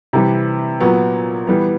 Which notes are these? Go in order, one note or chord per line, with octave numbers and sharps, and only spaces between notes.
C3 E3 G3
A#2 F#3 B3
E3 G3 B3